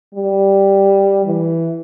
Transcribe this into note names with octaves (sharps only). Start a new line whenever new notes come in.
G3
E3